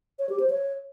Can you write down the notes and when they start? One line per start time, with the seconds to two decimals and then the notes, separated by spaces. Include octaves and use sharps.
0.19 C#5
0.29 G4
0.40 C5
0.50 C#5